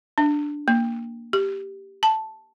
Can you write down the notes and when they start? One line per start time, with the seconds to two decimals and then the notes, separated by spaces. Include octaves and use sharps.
0.18 D4
0.68 A#3
1.33 G4
2.03 A5